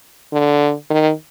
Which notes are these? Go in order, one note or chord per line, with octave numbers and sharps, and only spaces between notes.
D3
D#3